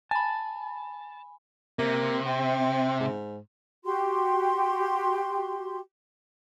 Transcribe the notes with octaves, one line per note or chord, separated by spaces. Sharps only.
G#5 A5 B5
C3 A#3
C4
G#2
F#4 G4 C6